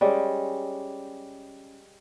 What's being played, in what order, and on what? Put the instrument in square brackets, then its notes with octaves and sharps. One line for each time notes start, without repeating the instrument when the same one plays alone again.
[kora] G3 G#3 C#4